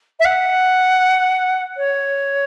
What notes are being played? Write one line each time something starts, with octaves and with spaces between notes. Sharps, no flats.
E5
F#5
C#5